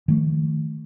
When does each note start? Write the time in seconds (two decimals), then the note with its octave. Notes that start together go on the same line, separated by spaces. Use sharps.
0.08 D#3 F3 A3